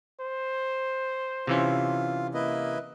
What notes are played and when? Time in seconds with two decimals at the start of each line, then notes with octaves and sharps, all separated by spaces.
0.21 C5
1.47 C3 E3 C#4 F4
2.34 A#3 E4 B4 D#5